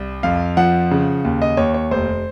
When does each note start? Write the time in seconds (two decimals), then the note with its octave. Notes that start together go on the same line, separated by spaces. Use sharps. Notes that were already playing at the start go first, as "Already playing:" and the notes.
Already playing: C2
0.23 F2 F5
0.57 F3 F#5
0.91 C#3
1.25 D#2
1.42 D#5
1.57 D#2 C#5
1.74 C#5
1.91 F1 C5